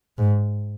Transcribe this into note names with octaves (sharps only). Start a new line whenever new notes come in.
G#2